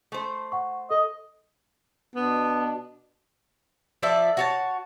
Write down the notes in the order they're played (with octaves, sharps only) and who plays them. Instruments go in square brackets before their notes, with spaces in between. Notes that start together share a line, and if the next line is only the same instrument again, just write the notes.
[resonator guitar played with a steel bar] A3 C5
[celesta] F#5 C#6
[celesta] A4 [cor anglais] D#5
[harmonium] B2 D4 [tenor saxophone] B3
[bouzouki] F3 A4 D5 E5
F#4 C#5 A5